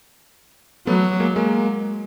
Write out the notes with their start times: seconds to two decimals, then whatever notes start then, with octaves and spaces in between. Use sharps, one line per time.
0.87 F#3 A3 B3
1.20 G#3 A#3
1.36 G#3 A#3